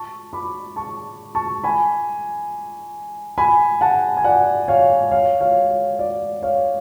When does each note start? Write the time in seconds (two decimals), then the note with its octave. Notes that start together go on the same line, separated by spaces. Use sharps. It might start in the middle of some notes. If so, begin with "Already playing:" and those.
Already playing: A5 C#6
0.33 B5 D6
0.76 A5 C#6
1.35 A5 C#6
1.63 G#5 B5
3.38 G#5 B5
3.81 F#5 A5
4.17 G#5
4.24 D5 F#5
4.68 C#5 F5
5.11 C#5 F5
5.40 C#5 F5
5.70 C#5
5.99 D5
6.42 C#5 F5